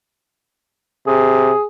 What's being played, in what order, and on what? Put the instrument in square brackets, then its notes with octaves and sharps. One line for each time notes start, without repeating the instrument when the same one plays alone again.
[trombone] C3 [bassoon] G#4